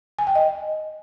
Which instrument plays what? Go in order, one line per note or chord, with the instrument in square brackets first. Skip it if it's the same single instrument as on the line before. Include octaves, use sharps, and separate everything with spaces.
[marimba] G#5
G5
D#5